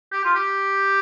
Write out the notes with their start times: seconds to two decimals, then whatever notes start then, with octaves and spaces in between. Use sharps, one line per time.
0.13 G4
0.25 F4
0.35 G4